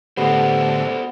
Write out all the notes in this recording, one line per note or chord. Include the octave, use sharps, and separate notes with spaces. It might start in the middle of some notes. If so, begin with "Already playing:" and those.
A2 D3 B3 F#4 G4 A4 C5